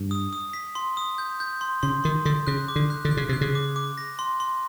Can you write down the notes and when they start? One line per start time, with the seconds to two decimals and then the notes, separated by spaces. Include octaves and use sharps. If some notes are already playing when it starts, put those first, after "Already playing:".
Already playing: G2
0.11 D#6
0.33 D#6
0.53 B6
0.75 C6
0.97 D#6
1.18 G6
1.40 G6
1.61 C6
1.83 C#3 C6
2.04 D#3 C6
2.25 D3 C6
2.47 C#3 F#6
2.68 D6
2.76 D3
2.90 F#6
3.05 D3
3.11 F#6
3.17 C#3
3.29 C3 F#6
3.41 C#3
3.55 D6
3.76 D6
3.98 A#6
4.19 C6
4.40 C6